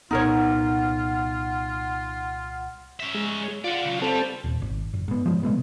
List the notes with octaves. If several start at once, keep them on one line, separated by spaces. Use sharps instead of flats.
C2 A#2 B3 D#4 F4 A#4 C#5 F#5
C#4 E5
G#3
F4 D5 F#5
C#3 F#3
G3 C4 A4
D#1
G#1
F#1
G#2 B3
F3 G#3
C3 G#3 A3 B3